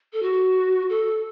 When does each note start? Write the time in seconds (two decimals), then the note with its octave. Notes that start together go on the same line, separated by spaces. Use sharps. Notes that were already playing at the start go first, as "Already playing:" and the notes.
0.13 A4
0.22 F#4
0.90 A4